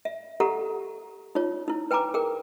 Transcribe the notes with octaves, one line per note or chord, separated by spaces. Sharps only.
E5
G4 A4 F#5 A#5
D#4 F4 C#5
D#4 E4
B4 G5 G#5 A#5 D6
G#4 A#4 G5